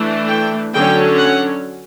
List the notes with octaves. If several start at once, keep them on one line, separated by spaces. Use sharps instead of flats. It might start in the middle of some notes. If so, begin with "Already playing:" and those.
Already playing: E3 A3 D4
G5
D3 F#3 C#4 G5
F#5